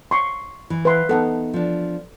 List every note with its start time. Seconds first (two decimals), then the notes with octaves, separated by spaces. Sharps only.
0.11 C6 C#6
0.70 E3
0.85 B4 E5 C6
1.09 B3 D4 D#4 A4 F#5
1.54 F3 D4